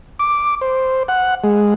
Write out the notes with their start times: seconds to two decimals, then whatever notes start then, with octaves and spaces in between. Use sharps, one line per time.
0.19 D6
0.61 C5
1.08 F#5
1.44 G#3